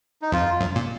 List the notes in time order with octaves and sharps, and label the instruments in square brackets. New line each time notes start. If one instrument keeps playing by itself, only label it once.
[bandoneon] D#4
[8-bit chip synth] F2 [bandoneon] F4
[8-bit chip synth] F#2
A#2